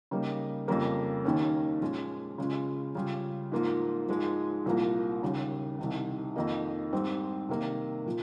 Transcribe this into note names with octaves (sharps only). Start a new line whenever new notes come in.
C#3 G3 A#3 D#4
F2 C#3 G3 A#3
D#2 D#3 A#3 C#4
A#2 F3 G#3 C#4 F4
C#3 G#3 C#4 F4
C#3 G3 C#4 F4
G#2 F3 A#3 F4
G#2 F3 G#3
C2 A#2 F3 A#3 F4
D#2 C#3 G3
C2 C3 D#3
F2 D#3 A#3 D#4
G#2 G3 C4
C3 D#3 A#3
A#2 F3